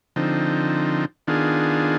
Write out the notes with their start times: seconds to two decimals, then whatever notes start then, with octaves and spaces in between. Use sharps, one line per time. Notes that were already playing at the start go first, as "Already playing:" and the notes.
0.16 D3 F3 C4 D#4
1.27 D#3 B3 D4 F4 G#4